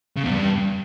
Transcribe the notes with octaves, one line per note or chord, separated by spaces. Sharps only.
C#3
E2
G2